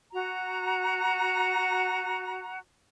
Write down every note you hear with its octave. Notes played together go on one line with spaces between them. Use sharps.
F#4 A#5